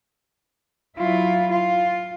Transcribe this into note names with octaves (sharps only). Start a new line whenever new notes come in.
F#3 E4 F4
F4